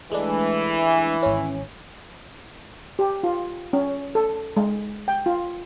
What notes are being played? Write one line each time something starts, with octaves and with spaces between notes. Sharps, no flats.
E3 G#3 A3 D4
G#1 C#4
G4
F4
C#4
A4
G#3
G5
F4